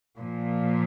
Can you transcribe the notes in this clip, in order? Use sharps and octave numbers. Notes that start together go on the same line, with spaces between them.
A#2 F3